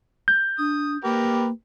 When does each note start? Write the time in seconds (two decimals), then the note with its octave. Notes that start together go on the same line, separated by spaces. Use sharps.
0.28 G6
0.58 D4 D#6
1.04 A#3 G4 A#4 B4